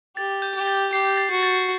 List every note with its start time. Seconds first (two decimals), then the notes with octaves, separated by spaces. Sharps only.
0.16 G4 A6
0.42 G6
0.55 G4
0.67 A6
0.93 G4 C7
1.17 A6
1.31 F#4
1.43 A6